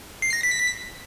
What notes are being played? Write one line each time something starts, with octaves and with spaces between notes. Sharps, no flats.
C7
A#6
B6